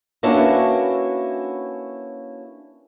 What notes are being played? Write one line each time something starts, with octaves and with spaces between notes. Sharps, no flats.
A#3 C#4 D4 E4 F#4 B4